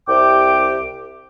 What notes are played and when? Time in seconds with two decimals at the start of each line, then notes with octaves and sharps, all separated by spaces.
0.09 C2 C3 G4 G5 D6